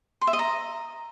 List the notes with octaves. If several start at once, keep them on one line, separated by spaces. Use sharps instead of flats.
C6
E5
D#5
A#5